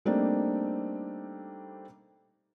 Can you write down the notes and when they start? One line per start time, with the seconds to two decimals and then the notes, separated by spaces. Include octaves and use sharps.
0.05 G3 A3 A#3 C4 D4 D#4